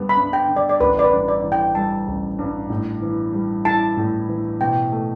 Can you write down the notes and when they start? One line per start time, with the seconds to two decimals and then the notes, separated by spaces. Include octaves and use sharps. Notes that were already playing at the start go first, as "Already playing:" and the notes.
Already playing: G2 D3 G3 B3
0.09 B5
0.17 G2
0.33 G5
0.48 D3
0.56 D5
0.69 D5
0.80 A1 B4
0.99 D5
1.04 B4
1.11 G2
1.28 D5
1.43 E3
1.52 G5
1.75 G3 A5
2.08 A1
2.39 G2
2.70 A2
3.02 E3
3.33 G3
3.65 E4 A5
3.97 A2
4.29 E3
4.61 B2 G5
4.92 A3